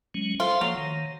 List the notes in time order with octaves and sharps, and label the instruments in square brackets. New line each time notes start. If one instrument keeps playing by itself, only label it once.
[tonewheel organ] F#3 G#3 C#4
[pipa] F4 [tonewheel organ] A4 C5 E5
[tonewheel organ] F3 A#3 [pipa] F#3
[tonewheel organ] D#3